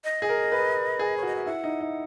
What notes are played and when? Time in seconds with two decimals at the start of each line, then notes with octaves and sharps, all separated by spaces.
0.04 D#5
0.22 G#4
0.29 A#4
0.52 B4
0.99 G#4
1.17 C#5
1.23 F#4 D#5
1.36 E5
1.46 E4 F#5
1.64 D#4
1.81 D#4